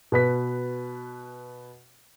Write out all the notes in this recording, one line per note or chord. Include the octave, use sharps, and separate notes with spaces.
B2 B4 B6